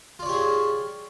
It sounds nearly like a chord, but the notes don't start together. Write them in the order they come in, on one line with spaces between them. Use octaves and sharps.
F4 D5 C#5 G4 G#4